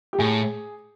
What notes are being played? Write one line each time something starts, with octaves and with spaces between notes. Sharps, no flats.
G4
A2 G#4